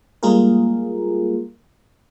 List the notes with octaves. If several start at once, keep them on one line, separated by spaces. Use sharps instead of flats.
G3 G#3 A#3 F4 G#4 A#4